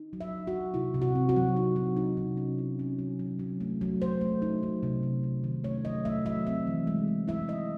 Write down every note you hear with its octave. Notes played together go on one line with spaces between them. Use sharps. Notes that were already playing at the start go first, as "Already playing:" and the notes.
Already playing: D#4
F#3
E5
D#4
F#4
F#3
C3 E4
C3
F#4
C4
F#4
F#3
D#4
F#3
D#4
C3
C#4
E4
C#4
F#3
F#3
F#3
A3
F#3
A3 C5
A3
D#4
F#3
C3
C3
C3
D#3
A3 C#5
F#3 D#5
A3 E5
F#3 E5
C4 E5
E3
G#3
G#3
E4 E5
E4 D#5